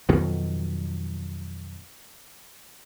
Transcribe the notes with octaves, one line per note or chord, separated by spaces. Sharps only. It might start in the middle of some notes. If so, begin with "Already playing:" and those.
F2 B2 D#3 F#3